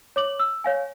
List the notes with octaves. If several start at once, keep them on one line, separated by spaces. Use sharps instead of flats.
C#5 D6 F#7
E6
C#5 F5 G#5